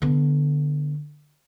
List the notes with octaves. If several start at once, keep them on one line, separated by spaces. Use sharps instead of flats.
D3 B3